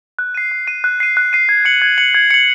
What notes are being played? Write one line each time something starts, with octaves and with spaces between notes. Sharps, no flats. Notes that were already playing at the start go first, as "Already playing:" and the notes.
F#6
C7 D#7
F#6
C7 D#7
F#6
C7 D#7
F#6
C7 D#7
G#6
C#7 F#7
G#6
C#7 F#7
G#6
C#7 F#7